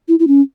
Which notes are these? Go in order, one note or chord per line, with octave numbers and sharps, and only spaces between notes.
E4
E4
C#4